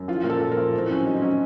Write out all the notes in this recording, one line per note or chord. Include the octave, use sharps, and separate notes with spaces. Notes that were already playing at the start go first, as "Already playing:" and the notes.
Already playing: F#2
F3 F4
A#2 A#4
A4
A#2
A#4
F3
A2 C4
F#3 C#4
F#3 D#4
F#3 C#4